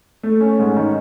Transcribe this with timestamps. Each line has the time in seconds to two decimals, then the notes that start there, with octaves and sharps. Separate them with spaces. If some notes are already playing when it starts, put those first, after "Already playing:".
0.23 A3
0.40 C#4
0.59 G#2
0.77 D#3